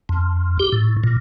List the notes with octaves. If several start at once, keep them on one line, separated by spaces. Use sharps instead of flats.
F2
G4
A2
A#2